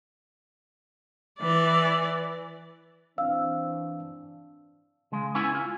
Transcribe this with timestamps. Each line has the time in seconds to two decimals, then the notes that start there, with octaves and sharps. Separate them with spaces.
1.39 E3 D5
3.18 E3 C4 D4 F5 E6
5.12 C#3 G#3
5.35 B3 C#4 E4 G#5
5.55 F4